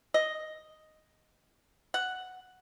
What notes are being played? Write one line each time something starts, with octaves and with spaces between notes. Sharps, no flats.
D#5
F#5